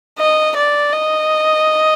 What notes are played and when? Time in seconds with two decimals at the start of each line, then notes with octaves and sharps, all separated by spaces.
0.19 D#5
0.56 D5
0.93 D#5